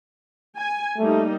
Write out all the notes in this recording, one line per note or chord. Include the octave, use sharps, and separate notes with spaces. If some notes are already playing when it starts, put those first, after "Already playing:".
G#5
G3 A3 A#3 D#4